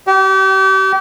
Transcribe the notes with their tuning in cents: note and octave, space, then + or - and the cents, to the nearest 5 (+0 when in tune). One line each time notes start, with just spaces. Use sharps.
G4 -35